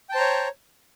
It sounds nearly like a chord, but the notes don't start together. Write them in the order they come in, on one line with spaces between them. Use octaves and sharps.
G5 A5 C5 A#5 C#5